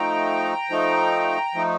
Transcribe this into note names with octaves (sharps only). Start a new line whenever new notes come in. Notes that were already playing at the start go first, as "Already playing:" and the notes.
Already playing: F3 A3 D#4 G5 A#5
F3 A3 D#4
F3 A3 D#4